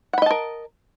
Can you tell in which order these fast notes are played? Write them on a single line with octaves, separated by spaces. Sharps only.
F#5 B5 D#5 A5 A#4